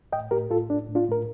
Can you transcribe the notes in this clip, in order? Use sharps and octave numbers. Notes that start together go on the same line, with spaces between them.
A2 D#5 G5
A2 G4 A#4
A2 F4 A4
A2 D4
A2
D4 F4
A2 A#4